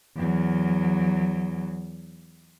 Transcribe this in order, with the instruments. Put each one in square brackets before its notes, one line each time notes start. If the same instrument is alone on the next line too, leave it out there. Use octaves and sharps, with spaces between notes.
[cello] E2 F#3